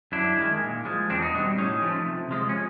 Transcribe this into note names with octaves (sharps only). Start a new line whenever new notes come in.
F#2 D4 E4
D#3 G#3
A#2
F3 G#3
E2 C4 D4
D#4
B2 G3 C4 D4
A2 C#4 D#4
F3 A3
C3
F3 G#3
C#4